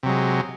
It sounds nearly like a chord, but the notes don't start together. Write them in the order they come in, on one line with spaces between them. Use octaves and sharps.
C3 F#3 G#3